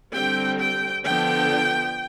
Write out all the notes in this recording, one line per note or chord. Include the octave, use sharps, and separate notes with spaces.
D3 G3 C4 G5
G5
D3 F3 B3 D4 G5